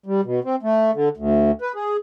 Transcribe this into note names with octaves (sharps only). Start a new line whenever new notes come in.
G3
B2
C4
A3
D3
D2
B4
G#4